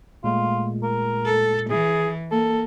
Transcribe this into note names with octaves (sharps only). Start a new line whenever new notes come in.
A#2 G#3 A3 F4
A#4
A4
E3 G#4
A#3 A4